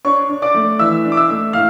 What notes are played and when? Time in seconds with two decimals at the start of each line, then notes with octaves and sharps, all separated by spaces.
0.05 D4 C#5 C#6
0.29 D4
0.42 D5 D6
0.54 A3
0.79 E3 E5 E6
1.05 D4
1.12 D6
1.17 E5 E6
1.30 A3
1.53 A2 F5 F6